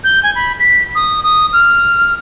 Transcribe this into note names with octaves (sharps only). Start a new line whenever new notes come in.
G6
G#5
B5
B6
D#6
D#6
F6